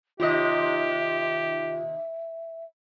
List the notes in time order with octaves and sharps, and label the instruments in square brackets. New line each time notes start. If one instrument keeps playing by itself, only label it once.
[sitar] D#2 C3 D#5 [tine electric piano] F4 [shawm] G4 [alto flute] E5